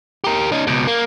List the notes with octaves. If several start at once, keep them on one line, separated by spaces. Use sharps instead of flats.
G4 A#4
C#4 D#4
C#2 B2
A#3